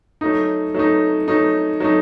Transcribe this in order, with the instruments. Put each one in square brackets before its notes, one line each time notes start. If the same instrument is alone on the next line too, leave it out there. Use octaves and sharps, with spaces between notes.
[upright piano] F#3 A3 D#4
F#3 A3 D#4
F#3 A3 D#4
F#3 A3 D#4